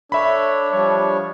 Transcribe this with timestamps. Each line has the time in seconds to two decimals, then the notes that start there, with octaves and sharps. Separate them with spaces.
0.12 D4 A4 C#5 E5 B5
0.71 F3 G3 C#5